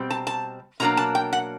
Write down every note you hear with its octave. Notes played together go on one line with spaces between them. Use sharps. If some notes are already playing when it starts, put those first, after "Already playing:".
Already playing: B2 G3 C4
A5
A5
B2 F#3 A#3 D4 A#5
A5
G5
F#5